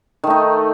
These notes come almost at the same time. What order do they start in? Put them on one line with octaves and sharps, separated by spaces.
D#3 A3 D#4